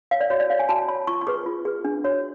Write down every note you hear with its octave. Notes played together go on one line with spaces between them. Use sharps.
C#5 F5
D5
F#4 C#5
D5
C#5 F5
G#5
F#4 A5
C#5 B5
F4 C#6
C#6
G#4 B4 D6
F4
G#4 B4
D4
F#4 C#5